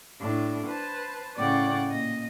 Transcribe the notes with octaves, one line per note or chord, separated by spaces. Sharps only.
A2 D4
B4 C5 A5
A2 C#3 C#5 D5 F#5 G5
A#2 D#5